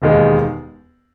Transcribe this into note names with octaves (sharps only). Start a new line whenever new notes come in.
E1 D#2 D#3 G#3